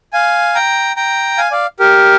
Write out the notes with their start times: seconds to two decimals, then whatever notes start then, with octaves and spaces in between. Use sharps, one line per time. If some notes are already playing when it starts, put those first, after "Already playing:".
0.13 F5 G#5
0.55 G5 A#5
0.96 G5 A#5
1.38 F5 G#5
1.51 D5 F5
1.80 G4 A#4